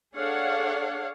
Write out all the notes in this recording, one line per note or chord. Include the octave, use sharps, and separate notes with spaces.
D4 G#4 A4 C#5 F5 F#5